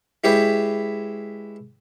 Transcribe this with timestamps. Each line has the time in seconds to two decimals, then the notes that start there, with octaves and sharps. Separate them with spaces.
0.24 G#3 E4 G4 B4 C#5 E5